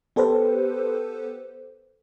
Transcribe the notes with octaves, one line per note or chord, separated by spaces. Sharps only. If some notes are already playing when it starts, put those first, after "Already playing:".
B3 G4 A4 B4 C5